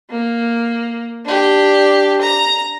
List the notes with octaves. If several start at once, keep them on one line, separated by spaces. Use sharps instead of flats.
A#3
D4 G4
A#5